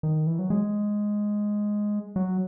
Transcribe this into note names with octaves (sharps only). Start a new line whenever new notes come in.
D#3
E3
F#3
G#3
F#3